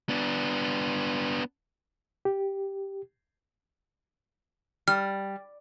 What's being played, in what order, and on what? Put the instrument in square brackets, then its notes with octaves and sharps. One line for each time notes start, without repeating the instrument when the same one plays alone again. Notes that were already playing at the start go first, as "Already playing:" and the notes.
[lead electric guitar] B3 D4
[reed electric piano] G4
[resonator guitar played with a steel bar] G3 [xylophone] F6